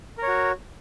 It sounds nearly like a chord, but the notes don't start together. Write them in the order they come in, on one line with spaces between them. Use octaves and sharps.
A#4 C#5 F#4